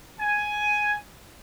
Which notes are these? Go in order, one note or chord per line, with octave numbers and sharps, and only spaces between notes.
G#5